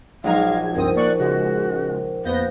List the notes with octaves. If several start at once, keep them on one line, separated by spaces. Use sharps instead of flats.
A#1 F#3 G#3 D#4 F5 A#5 G#6
C#2 G2 C4 A#4 C5 D#6
A#3 D5 C#6 F#6
C#3 G#3 F#4
F2 A#3 B3 C5 F5 G6 A#6